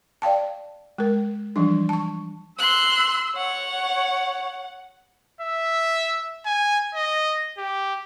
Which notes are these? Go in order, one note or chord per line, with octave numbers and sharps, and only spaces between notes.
D5 F5 G5 A5
G#3 A#4
E3 F3 G3 D4
A5 C#6
C6 E6 F#6
C#5 F#5
E5
G#5
D#5
G4